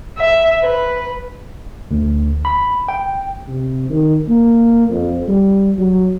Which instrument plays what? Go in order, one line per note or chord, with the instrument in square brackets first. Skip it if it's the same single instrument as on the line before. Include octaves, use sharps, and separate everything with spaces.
[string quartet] E5
B4
[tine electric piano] D2
B5
G5
[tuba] C3
D#3
A#3
F2
G3
F#3